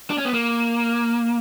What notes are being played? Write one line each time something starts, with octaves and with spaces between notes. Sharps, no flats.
D4
C#4
B3
A#3